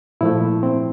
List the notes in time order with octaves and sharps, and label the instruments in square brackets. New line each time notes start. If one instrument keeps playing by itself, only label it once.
[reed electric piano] A#2 F3 A3 E4
C4